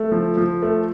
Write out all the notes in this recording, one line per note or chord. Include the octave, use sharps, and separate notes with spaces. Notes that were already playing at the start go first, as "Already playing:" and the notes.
Already playing: A3
F3
F3
A3